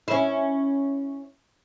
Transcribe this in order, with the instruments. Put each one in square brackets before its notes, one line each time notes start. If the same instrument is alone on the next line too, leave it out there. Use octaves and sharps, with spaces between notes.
[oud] C#4 E4